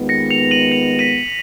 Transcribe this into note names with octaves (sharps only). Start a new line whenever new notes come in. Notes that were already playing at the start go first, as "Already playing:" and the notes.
Already playing: D#2 D#3 G#3 B3 F4
A#6 C#7
C#7 F7
D#7 F#7
C#7 F7
B6 D#7